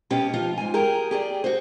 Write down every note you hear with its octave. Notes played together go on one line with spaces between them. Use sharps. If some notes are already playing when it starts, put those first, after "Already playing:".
B2 B3 C#4 G4
F3 D#4 F4
G#2 G#5
G4 G#4 A#4 G5
G4 G#4 D5
F#4 C5